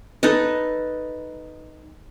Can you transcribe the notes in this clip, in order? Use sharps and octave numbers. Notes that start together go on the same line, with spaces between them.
D#4 A4 B4 D#5